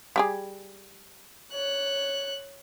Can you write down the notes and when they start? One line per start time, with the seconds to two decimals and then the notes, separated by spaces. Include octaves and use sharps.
0.16 G3 G4 G#4
1.52 C#5 F#6